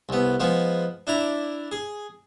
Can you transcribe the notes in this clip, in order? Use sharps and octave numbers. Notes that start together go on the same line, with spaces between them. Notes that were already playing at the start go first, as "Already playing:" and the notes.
C2 B3
F3 G#3 B3
D4 E4 A#5
G#4